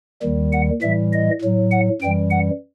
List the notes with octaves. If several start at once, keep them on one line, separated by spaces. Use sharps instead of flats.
D#2 D#3 G3
F#5
A2 E3 G3 E5
D#5
A2 F#3
F#5
F#2 E3 G3 G5
F#5